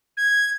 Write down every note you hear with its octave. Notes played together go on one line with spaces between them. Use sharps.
G#6